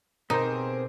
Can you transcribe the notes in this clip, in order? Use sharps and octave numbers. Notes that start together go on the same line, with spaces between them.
B2 C4 D#4 G4 G#4 A#4 C5